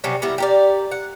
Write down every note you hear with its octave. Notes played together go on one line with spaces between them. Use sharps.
C3 F#3 G3 C#4
G3 B3 E4 A#4
G4 A#4 D5
F#5